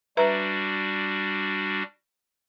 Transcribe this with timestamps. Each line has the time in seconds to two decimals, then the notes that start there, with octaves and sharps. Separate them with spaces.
0.17 G3 D4 F#4 B4 E5 A#5